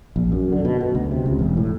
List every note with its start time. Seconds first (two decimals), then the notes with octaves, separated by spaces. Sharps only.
0.16 A#1
0.32 F#2
0.52 D3
0.65 B2
0.80 B2
0.95 D2
1.11 C3
1.26 C#2
1.39 E1
1.57 A2